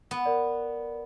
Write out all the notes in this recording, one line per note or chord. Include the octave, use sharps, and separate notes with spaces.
B3
A#4 D5